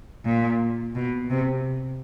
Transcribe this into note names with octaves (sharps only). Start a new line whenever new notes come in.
A#2
B2
C3